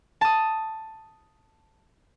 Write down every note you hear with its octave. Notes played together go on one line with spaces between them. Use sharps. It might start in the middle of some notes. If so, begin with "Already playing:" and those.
A5 D#6